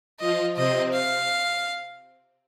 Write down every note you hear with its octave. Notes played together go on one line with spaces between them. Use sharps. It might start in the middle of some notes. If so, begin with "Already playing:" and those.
F3 F4 D#5
C3 C4 D#5
F5